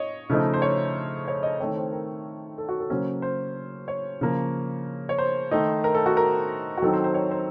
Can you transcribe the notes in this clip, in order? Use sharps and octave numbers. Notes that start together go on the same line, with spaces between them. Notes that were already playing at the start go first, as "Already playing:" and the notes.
Already playing: C#5 D#5
C#3 F3 A3 D#4
C5
C#5
C#5
D#5
D#3 A3 C4 C#5
C5
A#4
A4
F#4
A4
C#3 F#3 A#3 C#4 C5
C5
C#5
C#3 F3 A#3
C#5
C5
D#3 A3 D#4
A#4
A4
F#4
A#4
F#4
D#3 F#3 C4 D#4 A4
C5
C5
C#5
C5